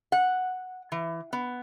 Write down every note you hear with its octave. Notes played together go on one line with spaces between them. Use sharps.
F#5
E3
B3